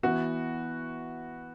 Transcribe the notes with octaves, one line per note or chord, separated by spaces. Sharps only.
E3 B3 E4 F#4 B4